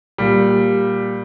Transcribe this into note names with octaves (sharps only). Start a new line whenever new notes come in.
A#2 G3